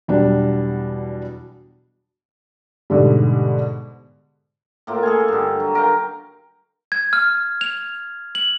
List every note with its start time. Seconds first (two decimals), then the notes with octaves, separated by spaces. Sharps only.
0.08 E2 B2 F#3 G3 D4
2.90 G#2 B2 D3 G3
4.87 A2 A#3 F4
5.03 G#4 A4 F5 G#5
5.28 G2 D3
5.60 F#3
5.75 A#4 F5 G5
6.92 G#6
7.13 F6
7.61 F7
8.35 F#7